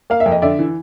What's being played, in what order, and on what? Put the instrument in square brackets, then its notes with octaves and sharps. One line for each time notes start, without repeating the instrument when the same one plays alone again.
[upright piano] A#3 F5
E5
F2
D#5
D3 D5 E5
E3